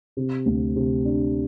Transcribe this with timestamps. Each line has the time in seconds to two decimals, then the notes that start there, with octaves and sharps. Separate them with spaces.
0.17 C3
0.46 D2
0.76 C3
1.05 D4